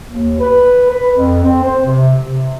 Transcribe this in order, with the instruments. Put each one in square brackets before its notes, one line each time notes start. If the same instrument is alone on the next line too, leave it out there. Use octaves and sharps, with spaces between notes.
[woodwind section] D#2
B4
B4
F2
C4
C5
C3
C3